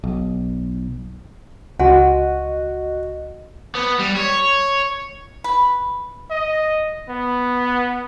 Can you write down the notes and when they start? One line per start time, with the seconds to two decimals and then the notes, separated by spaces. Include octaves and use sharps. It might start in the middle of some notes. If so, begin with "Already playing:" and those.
0.04 B1
1.79 C#2 F#4 D#5 F#5 G#5 C6
3.75 B3
3.99 G3
4.16 C#5
5.44 B4
6.30 D#5
7.09 B3